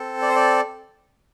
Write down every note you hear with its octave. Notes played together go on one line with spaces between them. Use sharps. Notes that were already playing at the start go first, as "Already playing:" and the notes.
Already playing: C4 A4
D5
C5
D5